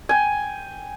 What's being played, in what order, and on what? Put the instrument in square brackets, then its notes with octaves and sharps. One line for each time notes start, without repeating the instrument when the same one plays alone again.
[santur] G5 G#5